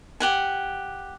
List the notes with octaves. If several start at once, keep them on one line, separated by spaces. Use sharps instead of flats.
G4 F#5 G#5